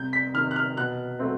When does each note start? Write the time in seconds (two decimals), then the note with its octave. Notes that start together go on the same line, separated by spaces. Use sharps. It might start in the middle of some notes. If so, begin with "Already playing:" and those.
Already playing: C2 G6
0.13 B6
0.34 C3 D#3 F6
0.51 F#6
0.56 F6
0.77 B2 F#6
1.19 F#3 A3 C4